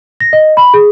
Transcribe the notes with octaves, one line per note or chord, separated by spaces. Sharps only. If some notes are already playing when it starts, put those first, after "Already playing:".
A#6
D#5
B5
G#4